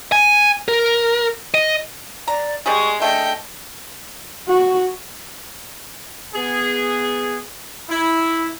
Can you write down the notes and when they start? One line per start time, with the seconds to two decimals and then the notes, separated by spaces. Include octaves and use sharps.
0.12 G#5
0.68 A#4
1.54 D#5
2.28 D5 A#5
2.66 G3 G#3 G#4 C#6
3.02 A3 D4 D#5 G5
4.48 F#4
6.34 B3 G#4
7.89 E4